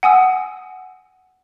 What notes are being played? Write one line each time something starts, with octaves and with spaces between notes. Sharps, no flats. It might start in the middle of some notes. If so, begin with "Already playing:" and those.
F#5 G#5 D#6 E6